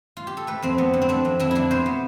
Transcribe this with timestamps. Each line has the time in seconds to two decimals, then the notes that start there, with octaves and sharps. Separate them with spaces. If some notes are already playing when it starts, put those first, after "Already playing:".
0.17 F4
0.27 G4
0.37 A4
0.47 A3 B4
0.62 F2 C4
0.78 F2 B3
0.93 D3
1.02 C4
1.09 A3 D4
1.25 F2
1.39 F2 E4
1.51 D3 D4 E4
1.71 B2 C5
1.86 B3